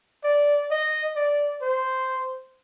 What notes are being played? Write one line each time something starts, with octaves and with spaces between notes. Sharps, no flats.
D5
D#5
D5
C5